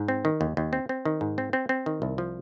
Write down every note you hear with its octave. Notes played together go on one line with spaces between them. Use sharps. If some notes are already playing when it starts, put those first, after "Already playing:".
Already playing: G#2
C4
D#3
D#2
D#2
C4
C4
D#3
G#2
C4
C4
C4
D#3
C2
F3